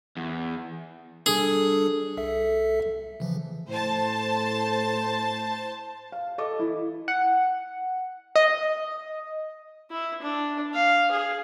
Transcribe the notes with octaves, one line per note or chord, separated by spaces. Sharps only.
E2
G3 D4 G#4 A4
C2 A4 E5
C#3 E3 F3
A2 C5 A5
F5
A4 D#5 D6
E3 E4
F#5
D#5
E4
D4
F5
G#4